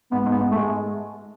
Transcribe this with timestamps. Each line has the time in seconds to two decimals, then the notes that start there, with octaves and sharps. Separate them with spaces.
0.12 G#2 B3
0.26 G#2
0.31 B3
0.41 G#2
0.51 A3
0.56 G#3